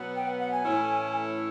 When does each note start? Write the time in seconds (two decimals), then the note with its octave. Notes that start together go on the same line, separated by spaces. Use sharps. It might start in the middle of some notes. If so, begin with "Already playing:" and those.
Already playing: B2 F#3 B3
0.15 G5
0.27 F#5
0.39 F#5
0.51 G#5
0.64 A2 E3 A3 C#4 E4